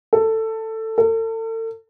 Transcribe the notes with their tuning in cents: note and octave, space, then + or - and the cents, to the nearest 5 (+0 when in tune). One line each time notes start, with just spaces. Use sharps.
A4 +15
A4 +40